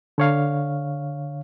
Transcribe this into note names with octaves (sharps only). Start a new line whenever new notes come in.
D3 C#5 F5